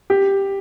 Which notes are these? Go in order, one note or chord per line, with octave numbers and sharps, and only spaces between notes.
G4